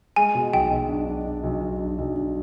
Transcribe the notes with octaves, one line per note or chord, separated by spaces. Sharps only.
G#3 G#5
B2
B1 G5
B1
D4
D4
D4
B1
B1
D4
B1
D4